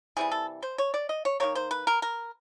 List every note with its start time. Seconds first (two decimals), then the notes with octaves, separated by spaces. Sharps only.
0.17 C3 E3 G3 G#4
0.31 A4
0.63 C5
0.78 C#5
0.94 D5
1.09 D#5
1.25 C#5
1.40 D#3 G3 A#3 C#5
1.55 C5
1.71 B4
1.87 A#4
2.02 A#4